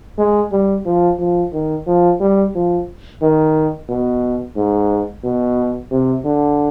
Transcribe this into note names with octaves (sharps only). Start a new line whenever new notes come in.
G#3
G3
F3
F3
D#3
F3
G3
F3
D#3
B2
G#2
B2
C3
D3